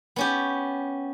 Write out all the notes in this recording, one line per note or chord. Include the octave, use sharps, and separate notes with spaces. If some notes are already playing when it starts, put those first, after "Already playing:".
B3 C#4 G4